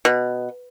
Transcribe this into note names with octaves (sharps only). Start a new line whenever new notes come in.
B2